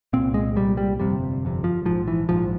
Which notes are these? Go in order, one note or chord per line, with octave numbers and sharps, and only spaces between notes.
C2 A#2 C4
G#3
C2 A#2 G3
G3
G1 F2 C3 G3
G1 F2 C3
F3
A#1 G#2 F3
E3
A#1 G#2 F3